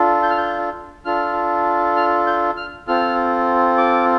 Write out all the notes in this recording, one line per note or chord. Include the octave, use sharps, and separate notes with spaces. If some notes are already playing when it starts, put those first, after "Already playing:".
Already playing: D4 F4 A4
G6
F6
G6
D4 F4 A4 F6
F6
G6
F6
C4 F4 A4 F6
D6